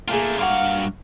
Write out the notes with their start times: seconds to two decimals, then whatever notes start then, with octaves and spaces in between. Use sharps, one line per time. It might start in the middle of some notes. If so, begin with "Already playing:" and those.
0.08 A3 A#3 D4 F4 G#4
0.39 G2 A#3 E4 F#4 F5